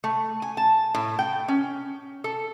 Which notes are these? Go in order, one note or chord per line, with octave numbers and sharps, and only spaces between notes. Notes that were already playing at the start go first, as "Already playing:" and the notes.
A3
G#5
A5
A2
G5
C#4
A4